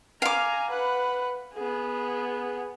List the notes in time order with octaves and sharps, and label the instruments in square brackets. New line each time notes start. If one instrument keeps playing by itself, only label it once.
[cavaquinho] F5 D6 [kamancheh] G#5 A#5
[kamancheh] B4 F#5
B3 G#4